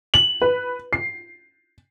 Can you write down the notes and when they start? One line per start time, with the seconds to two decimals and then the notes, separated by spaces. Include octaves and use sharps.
0.14 F#7
0.42 B4
0.93 C7